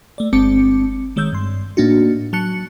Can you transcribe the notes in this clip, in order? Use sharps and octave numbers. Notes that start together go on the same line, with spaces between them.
A3 D5
G1 G#3 C4 A5 D6 C#7
D#3 G#3 C#5 E6 G6
G2 C6
A2 A#3 D4 D#4 F#4
F#3 A5 F#6 C#7